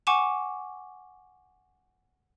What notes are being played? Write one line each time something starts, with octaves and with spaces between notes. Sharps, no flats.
F#5 G#5 C#6 D6 E7